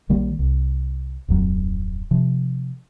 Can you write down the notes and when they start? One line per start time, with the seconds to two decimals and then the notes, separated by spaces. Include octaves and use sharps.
0.09 A#1 D#3 G3 A#3
0.39 C2
1.28 D1 F2 F#3
2.11 C3 F3